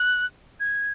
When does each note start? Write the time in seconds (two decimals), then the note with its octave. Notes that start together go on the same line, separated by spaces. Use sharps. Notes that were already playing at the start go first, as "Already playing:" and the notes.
Already playing: F#6
0.60 G#6